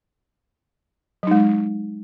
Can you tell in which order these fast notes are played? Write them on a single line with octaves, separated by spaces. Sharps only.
F#3 D#4 G#3